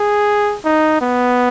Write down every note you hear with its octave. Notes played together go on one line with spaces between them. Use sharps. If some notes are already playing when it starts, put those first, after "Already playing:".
Already playing: G#4
D#4
B3